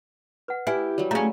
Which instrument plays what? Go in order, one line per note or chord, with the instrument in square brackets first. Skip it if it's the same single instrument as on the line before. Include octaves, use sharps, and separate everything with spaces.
[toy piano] B4 F#5
[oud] E4 [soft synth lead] G4 [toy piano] B4 D5 G#5
[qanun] F#3 G3
[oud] A3 C#4 [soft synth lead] G#4 [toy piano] F5 A#5